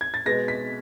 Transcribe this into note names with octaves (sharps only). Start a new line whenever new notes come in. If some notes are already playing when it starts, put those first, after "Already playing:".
G#6
A6
B2 G#3 B3 A#6
B6